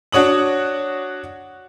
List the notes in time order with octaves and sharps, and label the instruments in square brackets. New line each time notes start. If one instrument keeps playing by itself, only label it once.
[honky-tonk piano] D4 F#4 C#5 D#6 F#7